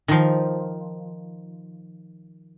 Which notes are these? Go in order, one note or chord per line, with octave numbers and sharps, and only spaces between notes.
D#3 F3